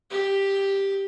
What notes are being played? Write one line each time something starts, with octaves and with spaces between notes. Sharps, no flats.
G4